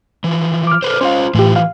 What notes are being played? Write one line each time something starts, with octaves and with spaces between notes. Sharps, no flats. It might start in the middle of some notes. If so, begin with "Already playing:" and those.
E3 F3
D6 F6
A4 B4 C5
C#4 F4 C5 F5
A2 E3 F4 G4
F5